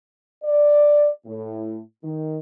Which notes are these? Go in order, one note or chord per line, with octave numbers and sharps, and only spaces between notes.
D5
A2
D#3